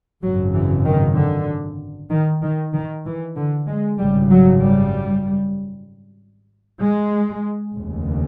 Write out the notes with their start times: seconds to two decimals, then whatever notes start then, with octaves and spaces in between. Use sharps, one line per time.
0.23 G#1 F#2 C#3 F#3
0.54 E3
0.86 D#3
1.16 D3
2.10 D#3
2.42 D#3
2.73 D#3
3.05 E3
3.36 D3
3.68 G#3
3.99 G#1 F#2 C#3 G3
4.30 F#3
4.62 G3
6.81 G#3
7.75 F1 D#2 C#3